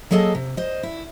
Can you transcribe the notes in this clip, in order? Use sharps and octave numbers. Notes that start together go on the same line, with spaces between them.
F#3 A#3 G#4 A4 D#5 A5
C3
C5 D#5
E4